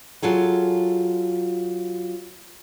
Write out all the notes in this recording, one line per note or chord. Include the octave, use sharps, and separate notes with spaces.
F#3 F4 G#4 A4